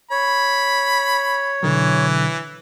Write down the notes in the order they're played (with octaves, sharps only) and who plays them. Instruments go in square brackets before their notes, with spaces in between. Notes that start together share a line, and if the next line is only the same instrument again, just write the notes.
[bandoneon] C#5 [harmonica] B5
[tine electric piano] B2 D3 F#3 [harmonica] E3